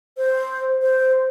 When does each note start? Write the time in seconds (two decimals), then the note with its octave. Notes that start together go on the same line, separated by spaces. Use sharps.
0.17 C5
0.82 C5